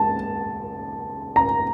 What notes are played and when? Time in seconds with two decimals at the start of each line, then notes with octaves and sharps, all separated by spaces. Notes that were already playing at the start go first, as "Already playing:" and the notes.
Already playing: G#3 A5
1.36 A#5